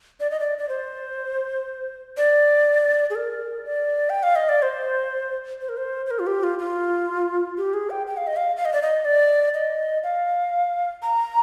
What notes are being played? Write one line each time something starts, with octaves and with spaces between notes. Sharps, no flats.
D5
D#5
D5
D5
C5
D5
G#4
A#4
D5
G5
F5
D#5
D5
C5
C5
A#4
C5
C5
A#4
F4
G4
F4
F4
G4
G#4
G5
G5
F5
D#5
F5
F5
D#5
D5
D#5
D5
D#5
F5
A#5